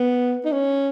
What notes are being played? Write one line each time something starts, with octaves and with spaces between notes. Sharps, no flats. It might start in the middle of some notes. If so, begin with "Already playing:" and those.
Already playing: B3
D#4
C#4